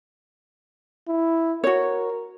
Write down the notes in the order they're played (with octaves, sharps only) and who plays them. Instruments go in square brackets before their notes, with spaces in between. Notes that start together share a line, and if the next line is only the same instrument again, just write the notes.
[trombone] E4
[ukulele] F#4 C#5 [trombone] A#4